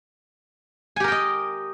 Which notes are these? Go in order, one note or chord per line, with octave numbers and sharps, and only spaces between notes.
G4 A#4 D#5 G5 G#5